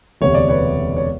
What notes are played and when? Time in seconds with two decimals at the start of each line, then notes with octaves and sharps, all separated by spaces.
0.21 E1 D2 C3 C#5
0.34 D5
0.48 B4 C#5
0.97 C#5